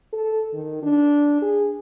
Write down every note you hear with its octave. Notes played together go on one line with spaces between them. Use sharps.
A4
D#3
D4
G#4